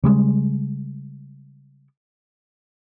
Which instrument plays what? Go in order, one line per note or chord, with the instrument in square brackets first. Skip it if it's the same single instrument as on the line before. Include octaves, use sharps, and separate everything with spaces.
[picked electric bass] C#3 G3 G#3